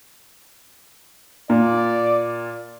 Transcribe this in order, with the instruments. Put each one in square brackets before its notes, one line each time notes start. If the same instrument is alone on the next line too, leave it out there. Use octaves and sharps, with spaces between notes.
[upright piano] A#2 [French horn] D5